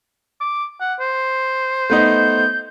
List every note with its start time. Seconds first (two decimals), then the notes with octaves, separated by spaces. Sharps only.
0.41 D6
0.80 F#5
1.00 C5
1.90 A3 B3 D#4 G6